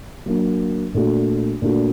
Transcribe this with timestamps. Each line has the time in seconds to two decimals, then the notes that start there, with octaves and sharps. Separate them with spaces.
0.26 F#3 A#3 D4
0.94 A#2 A3 D4 F#4
1.62 A#2 A3 D4 F#4